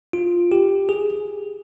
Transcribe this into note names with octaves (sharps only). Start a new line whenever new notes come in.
F4
G4
G#4